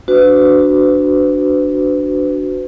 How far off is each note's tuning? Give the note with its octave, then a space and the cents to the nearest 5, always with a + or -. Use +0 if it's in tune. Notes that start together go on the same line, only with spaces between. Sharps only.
D4 +0 F#4 +0 B4 +35